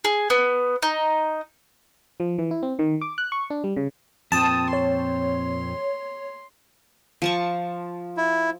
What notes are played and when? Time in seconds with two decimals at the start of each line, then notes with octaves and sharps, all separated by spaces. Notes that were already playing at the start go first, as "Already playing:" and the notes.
0.05 G#4
0.30 B3
0.83 D#4
2.20 F3
2.38 E3
2.51 E4
2.63 C4
2.79 D#3
3.01 D6
3.18 F#6
3.32 C#6
3.50 D4
3.64 G3
3.76 C#3
4.32 F2 A#2 C4 A5 D#6
4.73 C#5 C6
7.22 F3 A5 C#6
8.17 E4